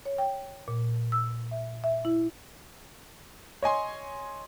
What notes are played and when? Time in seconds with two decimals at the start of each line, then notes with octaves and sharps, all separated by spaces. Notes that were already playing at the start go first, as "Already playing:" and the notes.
0.05 C#5
0.18 G5
0.68 A#2
1.12 E6
1.51 E5
1.84 E5
2.05 E4
3.62 C#5 D#5 G#5 C6